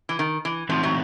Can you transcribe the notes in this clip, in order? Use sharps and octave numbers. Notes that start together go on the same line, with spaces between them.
E3
D#3
E3
E3 F3 A3 C4 D#4 F#4
F#3